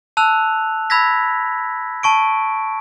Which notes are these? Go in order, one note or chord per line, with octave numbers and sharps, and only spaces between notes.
A5 E6 F#6 F7
B5 E6 G#6 A#6 B6
A5 C#6 D7